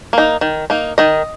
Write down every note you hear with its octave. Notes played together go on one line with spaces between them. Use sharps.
A#3 D#4
D#3
A#3 D#4
D#3 D#5